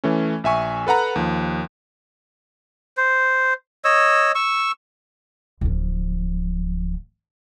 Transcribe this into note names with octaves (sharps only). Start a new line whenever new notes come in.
E3 A3 C#4
A#1 E5 G#5 C#6
A4 B4 F#5 A#5 F#6
D#2 F3
C5
C#5 D#5 E6
C#6 E6
D1 F3